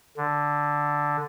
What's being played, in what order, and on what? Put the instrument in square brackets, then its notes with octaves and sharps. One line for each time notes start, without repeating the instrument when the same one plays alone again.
[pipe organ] D3